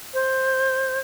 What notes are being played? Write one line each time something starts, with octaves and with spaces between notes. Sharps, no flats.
C5